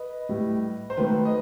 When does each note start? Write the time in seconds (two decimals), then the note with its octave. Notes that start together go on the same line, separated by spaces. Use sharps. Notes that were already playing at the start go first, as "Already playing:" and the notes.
Already playing: B4 D#5
0.29 A2 G3
0.90 C5
0.97 D#3 F#3 A3 B4
1.25 D#5